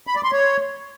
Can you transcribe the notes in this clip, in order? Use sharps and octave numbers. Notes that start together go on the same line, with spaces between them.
B5
D5
C6
C#5